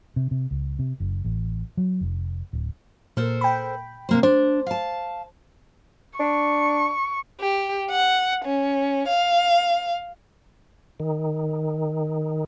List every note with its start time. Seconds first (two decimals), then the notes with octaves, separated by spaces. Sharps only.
0.16 C3
0.31 C3
0.51 C#2
0.79 C3
1.00 F#1
1.25 A1
1.77 F#3
2.01 F1
2.53 D1
3.17 A#2 A4 A#4 C5
3.41 G5 B5
4.09 C3 A#3 C5
4.23 D4 C5
4.66 F5 A5
6.19 D4 C#6
7.40 G4
7.90 F#5
8.44 C#4
9.08 F5
11.00 D#3